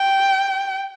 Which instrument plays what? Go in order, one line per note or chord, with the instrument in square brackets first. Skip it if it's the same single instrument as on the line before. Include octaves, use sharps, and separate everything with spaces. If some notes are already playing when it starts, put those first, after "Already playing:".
Already playing: [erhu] G5